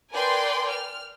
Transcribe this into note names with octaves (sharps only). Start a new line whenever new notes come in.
A#4 B4 D5 G5 G#5 C6
F6